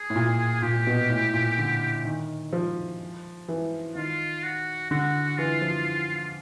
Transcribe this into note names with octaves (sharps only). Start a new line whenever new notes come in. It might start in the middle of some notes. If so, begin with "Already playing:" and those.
Already playing: G#4
A2
A#2
A#2 G4
B2
A2
A#2
D3
D#3
F3
E3
D#3 F4
F#4
D3 F#4
E3 F4
F3